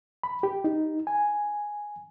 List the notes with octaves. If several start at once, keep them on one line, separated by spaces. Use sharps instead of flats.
B5
G4
D#4
G#5